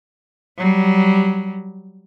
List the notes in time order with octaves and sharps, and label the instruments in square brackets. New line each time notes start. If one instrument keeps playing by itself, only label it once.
[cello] F#3 G3